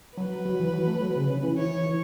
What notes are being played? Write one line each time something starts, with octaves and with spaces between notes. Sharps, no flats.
F#3 B4
F#3
E3
F#3
A3
F#3
C#3
C#3
E3
E3 C#5
E3